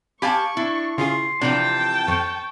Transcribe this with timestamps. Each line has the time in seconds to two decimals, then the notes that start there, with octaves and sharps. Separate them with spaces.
0.22 G4 F5 G#5 A5 B5 C#6
0.57 D4 E4
0.98 C#3 F4 G#4 C6
1.41 C3 E3 F3 D4 G5 A5
2.08 F2 C#6